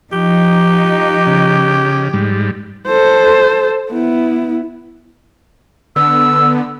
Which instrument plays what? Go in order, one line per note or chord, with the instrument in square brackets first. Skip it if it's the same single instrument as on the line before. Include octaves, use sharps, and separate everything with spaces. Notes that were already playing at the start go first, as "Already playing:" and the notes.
[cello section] F3 D#4 [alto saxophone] G4
[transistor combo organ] C#3
G#2 G3
[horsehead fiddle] A4 C5
B3 E4
[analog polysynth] D3 B3 [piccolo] E6